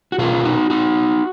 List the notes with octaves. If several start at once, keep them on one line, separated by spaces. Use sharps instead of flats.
F#4
B2 A#3 C#4 F4 G#4
D#4 F#4
D#4 F#4